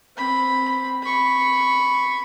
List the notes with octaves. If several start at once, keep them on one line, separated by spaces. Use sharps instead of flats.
C4 B5
B5 C#6